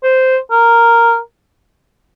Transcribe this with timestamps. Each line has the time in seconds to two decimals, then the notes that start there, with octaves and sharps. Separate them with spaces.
0.03 C5
0.51 A#4